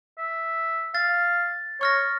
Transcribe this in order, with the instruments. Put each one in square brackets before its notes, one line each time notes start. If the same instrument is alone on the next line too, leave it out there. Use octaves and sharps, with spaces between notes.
[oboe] E5
[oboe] F5 [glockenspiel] A6
[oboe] C#5 [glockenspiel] C#6 F6 A#6